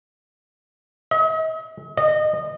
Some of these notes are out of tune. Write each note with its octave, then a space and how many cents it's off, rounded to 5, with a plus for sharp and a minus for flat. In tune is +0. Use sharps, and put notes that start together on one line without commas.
D#5 +45
D#5 -25